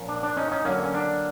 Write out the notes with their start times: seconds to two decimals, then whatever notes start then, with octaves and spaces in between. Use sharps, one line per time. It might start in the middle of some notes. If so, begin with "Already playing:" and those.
Already playing: A#2 F3 A#3 C#4
0.09 D4
0.23 D4
0.37 C#4 D#4
0.51 C#4 D#4
0.65 D3 F#3 A#3 C#4
0.83 C#4
0.94 D4